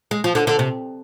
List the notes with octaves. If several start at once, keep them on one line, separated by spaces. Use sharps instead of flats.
G#3
F3
D3
D3
C3